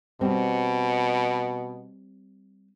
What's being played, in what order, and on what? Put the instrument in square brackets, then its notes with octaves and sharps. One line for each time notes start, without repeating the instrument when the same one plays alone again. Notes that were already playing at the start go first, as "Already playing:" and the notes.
[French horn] B2 [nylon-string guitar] G3 C4